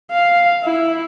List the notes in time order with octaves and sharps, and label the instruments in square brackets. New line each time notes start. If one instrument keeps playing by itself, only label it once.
[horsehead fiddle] F5
E4